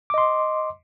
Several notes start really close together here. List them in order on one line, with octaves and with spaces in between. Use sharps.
D6 D#5 C6